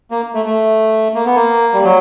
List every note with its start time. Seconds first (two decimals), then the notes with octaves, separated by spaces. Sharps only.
0.11 A#3
0.34 A3
0.46 A3
1.15 A#3
1.26 B3
1.35 A#3
1.74 G3
1.84 F#3